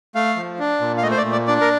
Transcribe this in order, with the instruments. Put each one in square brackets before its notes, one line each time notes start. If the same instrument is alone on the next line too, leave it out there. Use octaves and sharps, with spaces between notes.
[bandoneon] A3 F5
F3
D4
A#2
F5
A3 D#5
C5
D5
A#2
D5
D4 D5
A#4